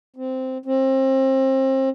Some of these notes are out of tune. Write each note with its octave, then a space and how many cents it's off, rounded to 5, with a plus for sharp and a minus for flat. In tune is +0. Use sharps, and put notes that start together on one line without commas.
C4 -10
C4 +30